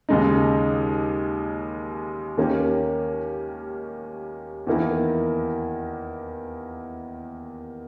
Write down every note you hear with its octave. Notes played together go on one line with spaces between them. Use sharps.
D#2 C#3 G#3 D#4
D#2 D#3 A#3 C#4 G4
E2 D#3 A#3 E4